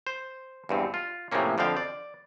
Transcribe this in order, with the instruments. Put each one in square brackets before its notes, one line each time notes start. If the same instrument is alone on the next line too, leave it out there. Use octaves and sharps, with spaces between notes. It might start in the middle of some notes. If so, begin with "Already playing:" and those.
[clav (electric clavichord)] C5
E2 G2 C4
F4
A2 C3 E3 F3 A#3 C#4
F2 D3 F3 C4 F5 G5
D5